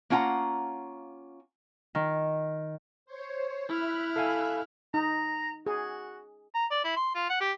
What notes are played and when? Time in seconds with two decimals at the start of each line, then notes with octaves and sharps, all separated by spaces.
0.10 A#3 C#4 F4 F#5 G5 A#5
1.95 D#3
3.06 C5 C#5
3.69 E4 E5 B5 F6 F#6
4.16 A4 F5 G#5
4.94 D#4 A#5
5.66 F#4 G#4
6.54 A#5
6.71 D5
6.84 E4
6.96 C6
7.15 F4
7.29 F#5
7.40 G4